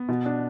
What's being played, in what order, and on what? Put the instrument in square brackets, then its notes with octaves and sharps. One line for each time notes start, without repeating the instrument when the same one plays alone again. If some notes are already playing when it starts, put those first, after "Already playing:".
Already playing: [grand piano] B3
[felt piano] B2
D4